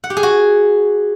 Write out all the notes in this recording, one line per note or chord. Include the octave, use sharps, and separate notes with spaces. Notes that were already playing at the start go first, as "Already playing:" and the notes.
F#5
G4
G#4
F#4